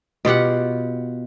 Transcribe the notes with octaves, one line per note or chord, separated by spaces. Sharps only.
B2 F4 G4 F#5